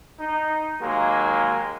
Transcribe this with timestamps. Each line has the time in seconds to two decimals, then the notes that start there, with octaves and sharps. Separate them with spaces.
0.20 D#4
0.80 D#2 D#3 F#3 G#3 A#3